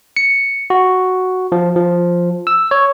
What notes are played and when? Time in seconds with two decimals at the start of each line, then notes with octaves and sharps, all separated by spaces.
0.17 C#7
0.70 F#4
1.52 F3
1.76 F3
2.47 E6
2.71 C#5